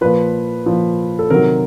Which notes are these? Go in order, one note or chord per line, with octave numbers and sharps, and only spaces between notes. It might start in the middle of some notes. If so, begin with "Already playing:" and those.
A#2 F3 B4
A#2 F3
A4
C3 D#3 F#3 A#4